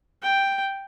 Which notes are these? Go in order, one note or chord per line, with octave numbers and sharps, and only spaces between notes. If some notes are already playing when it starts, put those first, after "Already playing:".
G5